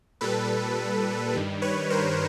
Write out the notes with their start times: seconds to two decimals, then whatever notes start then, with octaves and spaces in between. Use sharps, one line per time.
0.21 A#2 G3 A4 B4
1.34 G2 D#3 G3
1.62 B4 C#5
1.90 A#4 C5